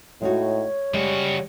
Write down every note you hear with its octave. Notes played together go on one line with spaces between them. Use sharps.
A2 G#3 D#4 F#4 C#5
C#3 G3 G#3 F#4